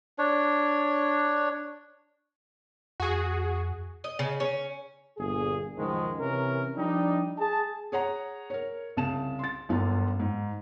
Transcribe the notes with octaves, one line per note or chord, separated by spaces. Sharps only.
D4 C#5
F2 F#4 G#4
D#5
C#3
C#4
G1 A#2 G#4
C#2 F#2 D#3 F3 G#3
C3 E3 C#4 A#4
F3 G3 D4 D#4
G#4 A5
G#4 C#5 F#5 A#5
A#4 C#5
C2 C#3 A5 E7
C6 A6
G1 F#2 F4
G#2